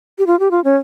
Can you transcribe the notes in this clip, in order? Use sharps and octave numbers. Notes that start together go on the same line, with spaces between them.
G4
F4
G4
F4
C#4